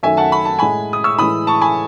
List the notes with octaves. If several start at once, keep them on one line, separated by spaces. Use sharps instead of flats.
F#2 D#3 A3 E5 G#5
F#5 A5
B5
A5
A2 G#3 G#5 B5
D#6
C#6 E6
A2 E3 G#3 B5 D#6
A5 C#6
G#5 B5